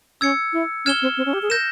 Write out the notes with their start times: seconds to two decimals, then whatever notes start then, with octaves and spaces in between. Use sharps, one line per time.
0.21 C#4 E6 G#6 C#7
0.53 E4
0.85 C#4 F6 G#6 E7 G7
1.02 C4
1.17 C4
1.26 C#4
1.33 G4
1.42 G#4
1.50 A#4 G6 A#6 E7